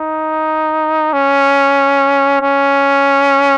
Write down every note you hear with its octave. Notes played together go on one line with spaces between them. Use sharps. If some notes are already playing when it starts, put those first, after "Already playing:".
Already playing: D#4
C#4
C#4